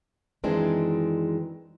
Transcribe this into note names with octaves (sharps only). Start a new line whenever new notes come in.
F#2 D#3 E3 G#3 C4 D4